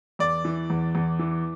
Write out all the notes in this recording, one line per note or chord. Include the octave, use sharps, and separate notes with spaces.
E2 D5
E3
E2
E2
E3